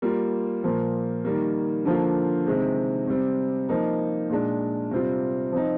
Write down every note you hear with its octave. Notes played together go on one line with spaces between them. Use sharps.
G3 A#3 F4
A#2 F3 A#3
D#3 G3 A#3
D3 F3 A#3 F4
C3 D#3 G#3 C4
C3 G3 C4
F3 A#3 D#4
A#2 G#3 D4
C3 G3 C4 F4
F3 C4 D#4